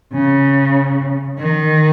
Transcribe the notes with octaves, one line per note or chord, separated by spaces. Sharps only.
C#3
D#3